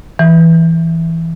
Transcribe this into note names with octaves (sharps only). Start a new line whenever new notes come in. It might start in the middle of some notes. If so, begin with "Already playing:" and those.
E3